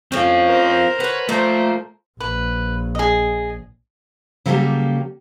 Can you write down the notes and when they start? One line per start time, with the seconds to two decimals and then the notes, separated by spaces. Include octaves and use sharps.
0.12 A2 C4 C#4 F4
0.48 A#4 C5
1.00 B4 C#5 F#5
1.29 A#2 F3 A3 A#3 C5
2.20 A#1 B4
2.95 G#4 D#5
4.46 C#3 F#3 G3 A#3 G4 A4